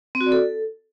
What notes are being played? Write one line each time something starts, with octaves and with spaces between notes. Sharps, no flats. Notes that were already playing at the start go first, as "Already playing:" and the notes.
C4
F#4
D5
A4